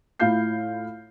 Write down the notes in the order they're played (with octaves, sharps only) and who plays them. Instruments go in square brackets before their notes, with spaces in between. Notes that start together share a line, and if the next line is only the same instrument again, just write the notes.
[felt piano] A2 E4 F4 F5 G6 C7